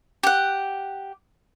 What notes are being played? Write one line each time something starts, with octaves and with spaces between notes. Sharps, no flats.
G4 F#5